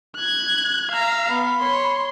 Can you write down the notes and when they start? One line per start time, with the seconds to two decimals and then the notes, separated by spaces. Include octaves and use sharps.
0.16 F#6 G#6
0.91 E5 F5 A#5
1.30 B3 B5
1.60 C#5 C6